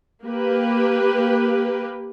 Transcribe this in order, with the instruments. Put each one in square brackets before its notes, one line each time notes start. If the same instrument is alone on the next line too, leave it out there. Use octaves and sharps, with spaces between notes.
[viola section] A#3 G4 B4